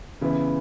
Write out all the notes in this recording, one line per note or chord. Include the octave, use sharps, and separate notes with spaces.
C#3 E3 B3 E4